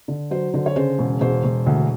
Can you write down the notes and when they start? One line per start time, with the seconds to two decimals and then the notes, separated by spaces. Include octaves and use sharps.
0.08 D3
0.30 F#3 C5
0.54 D3 C5
0.66 C#5
0.76 C#3 C5
0.99 E1
1.21 E1 C5
1.44 E1
1.66 D2